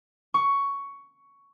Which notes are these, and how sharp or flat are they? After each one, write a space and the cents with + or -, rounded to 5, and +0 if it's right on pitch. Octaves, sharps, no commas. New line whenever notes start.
C#6 +10